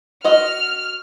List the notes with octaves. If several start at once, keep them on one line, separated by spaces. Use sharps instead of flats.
F#4 D#5 F6